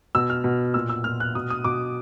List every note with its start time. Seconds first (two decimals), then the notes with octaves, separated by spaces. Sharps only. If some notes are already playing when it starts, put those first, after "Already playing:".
0.15 B2 E6
0.30 F6
0.44 B2
0.74 A#2 E6
0.89 E6
1.04 A#2 F6
1.20 F#6
1.35 B2 D#6
1.50 D#6
1.64 B2 D6